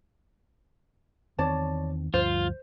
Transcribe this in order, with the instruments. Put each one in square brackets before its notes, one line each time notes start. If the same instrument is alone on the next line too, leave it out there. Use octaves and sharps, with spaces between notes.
[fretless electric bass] E2 D#3 C4 [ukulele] C#5 D5 A5
[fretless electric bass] D2 G2 F3 [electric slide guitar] F4 [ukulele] C5